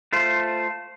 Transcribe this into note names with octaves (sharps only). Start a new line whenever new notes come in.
A3 F4 C5